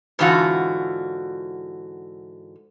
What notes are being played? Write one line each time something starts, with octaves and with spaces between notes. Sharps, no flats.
G#2 D3 E3 F4 F#4